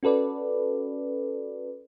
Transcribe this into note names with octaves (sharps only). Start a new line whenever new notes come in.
C#4 F#4 A4 B4 D5